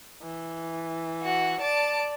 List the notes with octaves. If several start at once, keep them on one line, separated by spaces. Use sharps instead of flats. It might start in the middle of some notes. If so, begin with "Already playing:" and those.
E3
F#4
D5 A5 D7